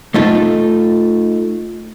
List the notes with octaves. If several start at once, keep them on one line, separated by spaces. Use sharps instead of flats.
A3 D#4 F4 A4